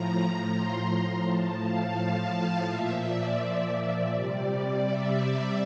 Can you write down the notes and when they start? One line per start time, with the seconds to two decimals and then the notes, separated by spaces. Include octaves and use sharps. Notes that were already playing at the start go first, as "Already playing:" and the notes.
Already playing: A2 F3 A#5
0.51 C6
1.22 A2 F3 A5
1.59 F5
2.67 A#2 F3 E5
3.04 D5
4.12 C3 G3
4.84 E5